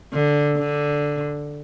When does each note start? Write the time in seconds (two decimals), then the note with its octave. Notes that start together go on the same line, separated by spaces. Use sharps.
0.13 D3
0.58 D3